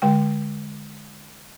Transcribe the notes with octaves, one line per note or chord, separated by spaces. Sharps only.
D3 G#3 G5